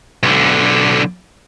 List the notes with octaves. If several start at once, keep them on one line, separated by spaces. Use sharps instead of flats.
B1 D3